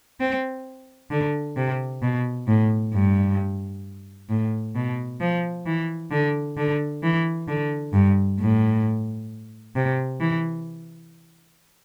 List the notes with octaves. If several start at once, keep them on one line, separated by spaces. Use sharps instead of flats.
C4
D3
C3
B2
A2
G2
A2
B2
F3
E3
D3
D3
E3
D3
G2
A2
C3
E3